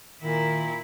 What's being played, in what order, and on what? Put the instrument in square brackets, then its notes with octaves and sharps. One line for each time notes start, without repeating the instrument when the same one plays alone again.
[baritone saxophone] A#2 [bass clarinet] D#3 [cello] E4